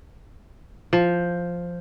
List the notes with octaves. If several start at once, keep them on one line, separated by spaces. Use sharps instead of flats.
F3